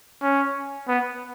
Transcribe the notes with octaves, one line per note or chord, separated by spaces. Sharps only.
C#4
B3